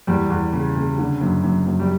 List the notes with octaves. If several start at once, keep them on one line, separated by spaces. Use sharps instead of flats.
E2 G3
E2
C#3
C#3
D3
F#2
F#2
F#2
G3